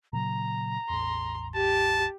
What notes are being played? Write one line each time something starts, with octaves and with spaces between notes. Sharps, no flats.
A#2 C#3 F#3 A#5
A1 E2 C6
G4 A5